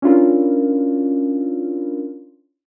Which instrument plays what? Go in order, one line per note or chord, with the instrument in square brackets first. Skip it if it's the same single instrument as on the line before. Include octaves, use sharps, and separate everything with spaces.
[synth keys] C#4 D4 E4 F4 A#4